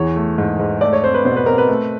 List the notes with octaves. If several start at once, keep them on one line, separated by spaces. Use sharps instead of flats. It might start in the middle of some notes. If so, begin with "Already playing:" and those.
Already playing: E2 E3 C#5
A3
G#2
G#2
A3 D5
C#5
C4 C5
B4
B2 C5
B4
C4 A#4
B4
A3